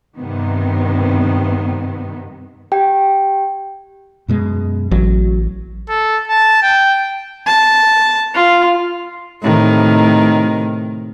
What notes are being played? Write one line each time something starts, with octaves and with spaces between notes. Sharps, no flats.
G2 C3 D#3 B3
G4 G5
F#2 B2 G#3
A1 F#3
A4
A5
G5
A5
F4
A2 C3 D#3